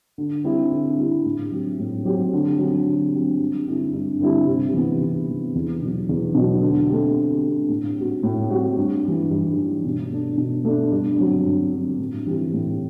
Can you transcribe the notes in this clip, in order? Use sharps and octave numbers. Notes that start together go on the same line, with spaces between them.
D3
G3 C4 E4 G4
D3
G3 C4 E4 G4
A2
F#3 C4 G4
A2
F#3 C4 G4
D3
F#3 C4 G4
D3
F#3 C4 G4
G2
D3 G3 C4 E4
G2
D3 G3 C4 E4
C3
E3 B3
C3
E3 B3
E2
B2 F#3
E2
B2 F#3
D3
A3 C4 G4
D3
A3 C4 G4
A2
G3 C4 F#4
A2
G3 C4 F#4
G2
E3 G3
G2
E3 G3
B2
A3 D4
B2
A3 D4
G2
D3 F#3 C4
G2
D3 F#3 C4
A2
E3 G3 C4 G4
A2